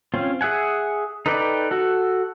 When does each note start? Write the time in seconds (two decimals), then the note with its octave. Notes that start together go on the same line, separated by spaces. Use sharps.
0.14 C4 C#4 F4
0.41 G#4 E5 F#5 G#5
1.26 D#4 A4 B4 D5 G5
1.71 F#4 A4